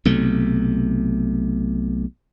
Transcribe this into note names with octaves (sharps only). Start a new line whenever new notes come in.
B1 C3 A3